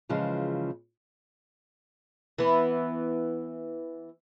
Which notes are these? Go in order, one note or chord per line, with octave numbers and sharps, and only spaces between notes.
C#3 E3 F3 G#3
E3 B3